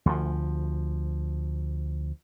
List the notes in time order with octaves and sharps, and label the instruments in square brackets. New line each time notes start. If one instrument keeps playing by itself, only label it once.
[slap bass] D2 F3